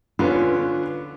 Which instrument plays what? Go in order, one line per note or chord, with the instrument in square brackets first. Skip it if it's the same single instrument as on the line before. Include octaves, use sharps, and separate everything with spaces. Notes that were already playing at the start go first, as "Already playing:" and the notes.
[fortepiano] D3 B3 C#4 [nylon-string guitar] F4